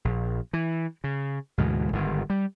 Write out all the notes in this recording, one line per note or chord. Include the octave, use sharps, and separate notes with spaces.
A#1
E3
C#3
D2 G#2 B2 E3
G1 G#2 D#3
G3